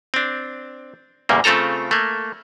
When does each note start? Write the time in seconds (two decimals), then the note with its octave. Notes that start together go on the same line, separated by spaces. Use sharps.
0.14 C4 D4
1.29 E2 A#2 C#3 G3 A#3
1.44 C#3 A3 C4 F4 A4 A#5
1.91 A3 A#3